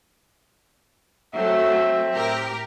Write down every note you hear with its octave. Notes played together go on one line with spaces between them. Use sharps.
F#3 A3 C4 E5
A2 G4 A#4